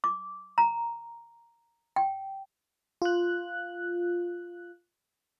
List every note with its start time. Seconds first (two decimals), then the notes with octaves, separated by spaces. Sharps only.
0.04 D6
0.58 A#5
1.96 G5
3.02 F4 F#6